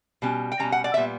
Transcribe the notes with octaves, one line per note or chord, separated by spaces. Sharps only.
B2 G3 C#4
G5
B2 G3 C#4 A#5
F#5
D5
A#2 G3 B3 E5